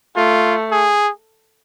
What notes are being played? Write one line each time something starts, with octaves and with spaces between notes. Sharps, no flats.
A3 F4
G#4